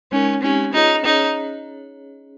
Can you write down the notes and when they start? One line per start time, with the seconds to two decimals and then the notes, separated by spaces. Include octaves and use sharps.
0.12 G#3 C#4 D#4 A#4
0.42 G#3 C4 C#4 D#4 G4 C#5
0.73 C#4 D#4 F4 G#4 C#5
1.04 C#4 D#4 G#4 C#5